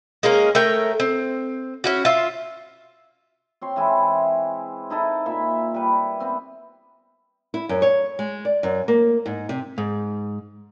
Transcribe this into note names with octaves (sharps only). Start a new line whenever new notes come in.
G#3 A#3 C#4 A#4
A3 A#4 C#5 G5
C4
C#4 E4 F#4
F4 E5
C4 C#5 C6
E3 G#3 E4
D#4 E4 A4
A#2 E5 B5
G3 B4
B3 C4
E4
F#2
C#5
G#3
D5
F#2
A#3
G#2
C3
G#2